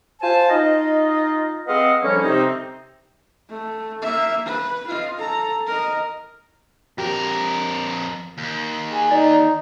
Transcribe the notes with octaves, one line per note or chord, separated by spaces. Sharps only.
F4 C5 G#5 A5
D#4 F4 D#5
G#3 C4 B4 D#5 F5 F#5
D3 F3 G3 A#3 C#4
C3 C4 D#4
A3
A#3 E5
B4
F4 D#5
A4 A#5
A#4 D#5
F2 G4 A#4
D#2
G#4
D#4 D5